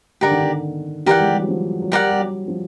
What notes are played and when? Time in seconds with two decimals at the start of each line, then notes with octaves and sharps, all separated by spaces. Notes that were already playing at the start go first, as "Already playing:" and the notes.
0.21 D3 G4 A#4 D5 F#5
0.31 D#3
0.40 D3
1.06 E3 G4 A#4 D5 F#5
1.20 G#3
1.30 G3
1.40 F#3
1.49 F3
1.82 F#3
1.91 G3 G4 A#4 D5 F#5
2.11 G3
2.19 F#3
2.48 F3